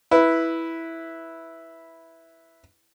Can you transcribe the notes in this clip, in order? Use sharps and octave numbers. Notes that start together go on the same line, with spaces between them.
E4 B4